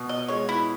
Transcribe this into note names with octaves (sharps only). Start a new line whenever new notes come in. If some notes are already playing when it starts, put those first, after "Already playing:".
Already playing: B2
D#5
G#3 C#5
E4